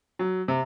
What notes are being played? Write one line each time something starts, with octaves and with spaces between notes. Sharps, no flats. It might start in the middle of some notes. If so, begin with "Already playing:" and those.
F#3
C3